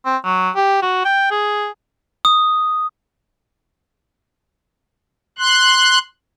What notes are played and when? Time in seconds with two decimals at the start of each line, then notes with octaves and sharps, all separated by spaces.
0.05 C4
0.24 F#3
0.56 G4
0.82 F#4
1.05 G5
1.31 G#4
2.25 D#6
5.38 C6 F#6